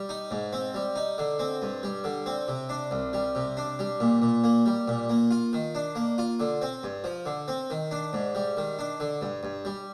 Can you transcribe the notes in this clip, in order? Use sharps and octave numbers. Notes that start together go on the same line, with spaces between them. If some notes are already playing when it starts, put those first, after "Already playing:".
Already playing: G3
D#4
G#2
C4
G3
D#4
D3
C4
G2
G3
D3
C4
C3
D4
C2
G3
C3
D4
G3
A#2
A#2
A#3
G3
A#2
A#3
F4
D#3
D4
A#3
F4
D3
C4
G2
F3
D3
C4
D#3
D4
G#2
G3
D#3
D4
D3
G2
G2
G3